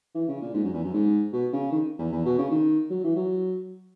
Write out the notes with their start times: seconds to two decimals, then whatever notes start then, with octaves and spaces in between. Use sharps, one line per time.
0.15 E3
0.28 C#3
0.42 A#2
0.54 G#2
0.64 F#2
0.74 E2
0.84 F#2
0.94 G#2
1.33 B2
1.53 C#3
1.72 D#3
1.99 E2
2.12 E2
2.25 B2
2.38 C#3
2.51 D#3
2.90 F#3
3.04 E3
3.16 F#3